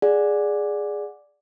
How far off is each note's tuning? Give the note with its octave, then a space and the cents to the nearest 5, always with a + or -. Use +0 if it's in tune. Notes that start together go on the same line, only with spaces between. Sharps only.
G#4 +0 D5 +0 F#5 -15